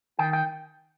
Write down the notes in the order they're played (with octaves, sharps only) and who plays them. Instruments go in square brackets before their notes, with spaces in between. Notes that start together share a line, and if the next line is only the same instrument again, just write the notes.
[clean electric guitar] D#3 G5
G5